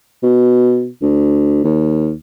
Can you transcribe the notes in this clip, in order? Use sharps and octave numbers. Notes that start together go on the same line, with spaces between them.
B2
D2
D#2